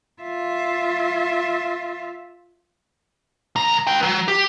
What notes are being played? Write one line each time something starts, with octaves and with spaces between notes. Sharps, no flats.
F4 E5
C#2 A#5
B4 G5
F#3
G4